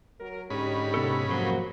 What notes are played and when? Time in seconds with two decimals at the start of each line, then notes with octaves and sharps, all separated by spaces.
0.20 F#3 A#4
0.50 G#2 D3 C#4 D#4 G4 B5
0.94 C3 B3 A4
1.30 F2 F#3 A#3 F#4 C5